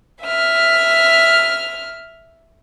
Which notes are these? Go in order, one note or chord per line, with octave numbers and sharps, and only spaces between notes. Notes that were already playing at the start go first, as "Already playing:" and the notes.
E5 F6